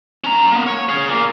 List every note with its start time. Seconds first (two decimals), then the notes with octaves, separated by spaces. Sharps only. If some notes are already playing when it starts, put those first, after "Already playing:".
0.24 C#4 A#5
0.51 A#3 B3
0.67 C#5
0.89 G#4 F5
1.08 A#2 A#3